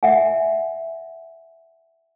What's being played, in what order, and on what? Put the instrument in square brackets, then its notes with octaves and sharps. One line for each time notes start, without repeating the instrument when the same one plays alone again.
[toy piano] E5 F#5 G#5